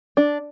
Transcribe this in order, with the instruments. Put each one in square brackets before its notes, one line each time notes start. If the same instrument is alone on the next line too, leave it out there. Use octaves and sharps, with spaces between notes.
[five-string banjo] D4